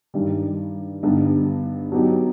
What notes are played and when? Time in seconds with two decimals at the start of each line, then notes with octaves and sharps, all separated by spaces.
0.14 G2 D#3 G3
1.03 G2 D3 G3 B3 D#4
1.92 F#3 B3 D#4 G4